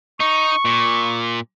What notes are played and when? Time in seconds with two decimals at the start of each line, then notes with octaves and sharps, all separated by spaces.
0.20 D#4 C#6
0.65 A#2